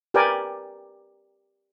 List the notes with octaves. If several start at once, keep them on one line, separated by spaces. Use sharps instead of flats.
G4 A#4 B4 D5 G5 G#5